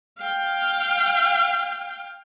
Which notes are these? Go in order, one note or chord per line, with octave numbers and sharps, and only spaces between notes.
F5 G5